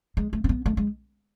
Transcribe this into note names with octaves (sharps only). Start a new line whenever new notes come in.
G#3
A3
C4
B3
A3
G#3